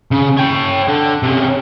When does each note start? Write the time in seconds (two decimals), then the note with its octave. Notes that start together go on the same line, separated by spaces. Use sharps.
0.11 C#3
0.37 C#5 G5
0.88 D3
1.23 C3 C#4